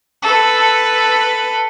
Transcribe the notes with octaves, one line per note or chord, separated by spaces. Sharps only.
A4 B4